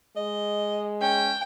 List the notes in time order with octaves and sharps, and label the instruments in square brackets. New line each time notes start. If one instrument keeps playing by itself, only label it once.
[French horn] G#3 [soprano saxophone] D#5
[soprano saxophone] C#4 [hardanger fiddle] G5